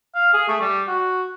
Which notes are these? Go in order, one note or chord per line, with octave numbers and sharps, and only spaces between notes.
F5
G#4
A3
G3
F#4